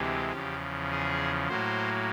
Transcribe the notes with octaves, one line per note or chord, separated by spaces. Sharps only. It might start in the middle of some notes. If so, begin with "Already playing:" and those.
Already playing: D2 C3 E3 G#3 G4
E2 C#3 F3
G#4
A2 F#3 A#3 C5